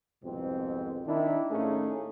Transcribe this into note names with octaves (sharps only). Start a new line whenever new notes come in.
C2 F2 G#2 B2 C4
D#3 D4 E4
A2 A3 A#3 C#4 D#4 G#4